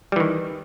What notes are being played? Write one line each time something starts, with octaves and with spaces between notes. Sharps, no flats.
D#3 E3 G3